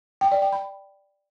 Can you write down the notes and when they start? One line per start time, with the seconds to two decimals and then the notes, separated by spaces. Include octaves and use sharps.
0.21 G5
0.32 D5
0.42 G5
0.52 B5